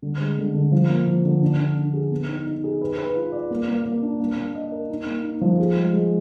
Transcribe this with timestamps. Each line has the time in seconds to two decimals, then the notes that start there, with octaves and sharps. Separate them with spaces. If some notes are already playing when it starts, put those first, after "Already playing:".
0.02 D3
0.20 G#3
0.38 D3
0.54 D3
0.72 F3
0.89 A#3
1.07 F3
1.25 D3
1.42 D4
1.59 D4
1.77 D4
1.94 G#4
2.11 B3
2.28 D#4
2.46 D#4
2.64 G#4
2.81 B4
2.98 B4
3.15 F4
3.32 D5
3.50 A#3
3.68 A#3
3.85 A#3
4.03 D4
4.20 A#3
4.37 A#3
4.55 D#5
4.72 A#4
4.89 D#4
5.06 A#3
5.23 D#4
5.41 F3
5.59 G#4
5.76 G#3
5.93 G#3